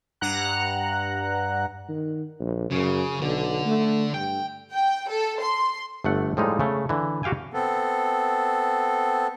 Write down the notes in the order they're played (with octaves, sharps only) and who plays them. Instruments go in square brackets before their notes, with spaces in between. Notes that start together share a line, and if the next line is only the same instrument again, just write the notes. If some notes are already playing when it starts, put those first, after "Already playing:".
[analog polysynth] G2 F#5 A#5 F#6
[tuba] D#3
A#1
[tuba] F#2 [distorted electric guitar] C#3
[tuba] B1 [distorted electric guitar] D3
[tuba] A3
[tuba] G2 [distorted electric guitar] G5
[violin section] G5
A4
C6
[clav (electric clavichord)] G1 A3 F#5
A2 F3 G3 G#3 D#4
C#3 A3
D3 E3
F#4 G4 F5 G5 G#5
[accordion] B3 C4 A4